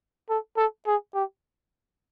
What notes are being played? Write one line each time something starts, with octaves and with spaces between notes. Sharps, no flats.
A4
A4
G#4
G4